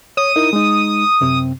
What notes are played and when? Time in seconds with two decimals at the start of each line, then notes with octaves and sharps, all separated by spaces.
0.17 C#5 D#6
0.36 D#4 E4 A#4
0.53 G#3 D#4
1.21 F#2 C3 C4